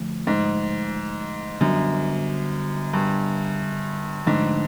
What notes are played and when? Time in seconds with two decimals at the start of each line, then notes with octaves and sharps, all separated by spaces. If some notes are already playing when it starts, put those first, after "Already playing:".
Already playing: D3 F3 A3
0.27 G#2
1.60 F#2 D3 G3 B3 D4
2.94 G2
4.26 G#2 D3 F3 A3 D4